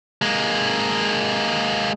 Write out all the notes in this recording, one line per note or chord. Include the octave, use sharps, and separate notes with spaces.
G#3 A#3